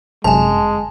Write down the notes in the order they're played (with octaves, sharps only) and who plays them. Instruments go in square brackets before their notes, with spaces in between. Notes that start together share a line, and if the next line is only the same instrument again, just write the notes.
[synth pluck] G1 F#2 C3 [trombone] G#3 [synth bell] G#5 A5